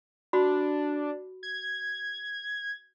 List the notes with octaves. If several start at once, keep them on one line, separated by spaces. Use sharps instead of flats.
D4 F#4 B5
G#6